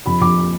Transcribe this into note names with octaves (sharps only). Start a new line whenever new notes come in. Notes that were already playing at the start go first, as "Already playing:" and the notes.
F2 B5
F2 D6